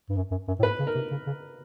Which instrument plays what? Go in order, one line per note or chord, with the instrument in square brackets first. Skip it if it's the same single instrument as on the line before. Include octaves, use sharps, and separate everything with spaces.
[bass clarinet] G2
F#2
F#2
F#2
A2
[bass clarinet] G#2 [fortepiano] B4
[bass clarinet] C#3
[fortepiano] A#4
[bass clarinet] C3
C#3
C#3